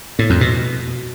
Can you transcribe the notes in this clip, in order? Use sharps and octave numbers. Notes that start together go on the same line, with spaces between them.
A2
F2
B2